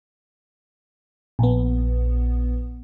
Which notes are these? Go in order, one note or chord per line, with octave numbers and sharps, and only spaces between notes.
A#1 B3